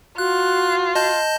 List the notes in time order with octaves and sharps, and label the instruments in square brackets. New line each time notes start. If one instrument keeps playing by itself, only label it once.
[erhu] F4 [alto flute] F#4 [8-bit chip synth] F#6
[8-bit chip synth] D#5 A5 G6